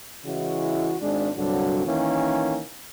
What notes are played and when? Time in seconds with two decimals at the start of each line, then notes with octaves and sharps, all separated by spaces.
0.25 C#3 E3 G#3 E4 F#4
1.01 G#1 G#3 D4
1.37 C2 G2 D3 F#3
1.85 D#3 E3 A#3 C#4